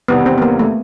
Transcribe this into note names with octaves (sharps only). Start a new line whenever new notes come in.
E2 C3 D#3 G3 B3
C4
B3
A#3
A3